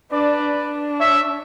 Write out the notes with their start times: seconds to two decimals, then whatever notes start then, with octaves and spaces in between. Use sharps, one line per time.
0.11 D4 B4 D5
0.56 D4
1.00 C#5 E5